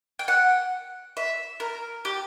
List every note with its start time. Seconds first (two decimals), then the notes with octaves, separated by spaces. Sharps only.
0.19 G5
0.28 F#5
1.17 E5
1.60 A#4
2.05 G4